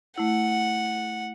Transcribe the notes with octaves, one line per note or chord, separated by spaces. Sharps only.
A3 E4 F#5